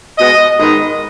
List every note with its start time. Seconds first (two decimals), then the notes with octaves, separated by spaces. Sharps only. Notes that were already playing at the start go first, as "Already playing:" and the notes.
0.18 B2 G#3 B3 D#5
0.59 G#2 D#3 G#3 B3 D#5